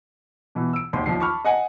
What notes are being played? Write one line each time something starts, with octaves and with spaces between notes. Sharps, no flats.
B2 E3
E6 D7
G#1 D#2 C6
D#2 F3 C7
A5 B5 C#6 D6 F6
D#5 F#5 G#5